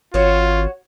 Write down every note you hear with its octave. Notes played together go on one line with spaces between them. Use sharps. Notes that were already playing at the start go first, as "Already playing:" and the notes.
G#1 F4 F#4 C#5